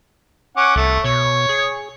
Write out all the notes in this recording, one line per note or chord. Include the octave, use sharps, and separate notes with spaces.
C#4 F#5 D6
C2 A3
B2 C#5
G#4